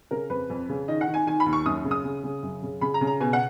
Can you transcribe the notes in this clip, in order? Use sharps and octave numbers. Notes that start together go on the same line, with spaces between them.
C#3 A#4
F2 B4
F2
C#3
D#3 D#5
F#5
D#3
G#5
D#3 G#5
B5
D#2
C#6
F#2 D#6
C#3
D#6
C#3
C#3
F#2
C#3
C#3 B5
A#5
C#3
A#5
B2 G#5
F#5